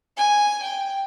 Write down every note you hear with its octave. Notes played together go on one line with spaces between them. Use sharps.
G#5
G5